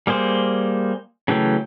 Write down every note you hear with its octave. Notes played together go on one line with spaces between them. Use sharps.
G3 A#3 G#4 C5
C#3 E3 F#3 A3 G5